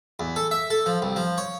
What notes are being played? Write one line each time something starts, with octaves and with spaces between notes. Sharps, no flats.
E2
A4
E5
A4
F3
C2
F3
C#5